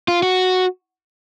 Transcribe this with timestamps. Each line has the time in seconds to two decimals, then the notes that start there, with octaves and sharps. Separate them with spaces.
0.08 F4
0.23 F#4